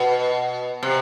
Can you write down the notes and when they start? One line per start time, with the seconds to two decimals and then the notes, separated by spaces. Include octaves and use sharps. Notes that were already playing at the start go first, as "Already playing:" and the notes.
Already playing: B2
0.83 C3